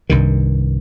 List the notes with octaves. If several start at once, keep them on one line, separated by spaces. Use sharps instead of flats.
C2 G2 D#3